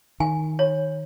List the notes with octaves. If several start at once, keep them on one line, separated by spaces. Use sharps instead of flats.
D#3 G#5
C#5